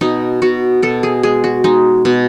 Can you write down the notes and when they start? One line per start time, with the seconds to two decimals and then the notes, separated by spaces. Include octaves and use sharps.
0.01 B2 D#4
0.42 B2 F#4
0.82 B2 A4
1.03 G#4
1.23 G#3 G#4
1.44 F#4
1.64 G#3 D#4
2.05 B2